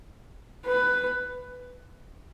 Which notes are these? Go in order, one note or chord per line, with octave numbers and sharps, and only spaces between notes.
B4